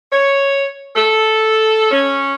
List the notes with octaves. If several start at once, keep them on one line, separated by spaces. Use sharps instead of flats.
C#5
A4
C#4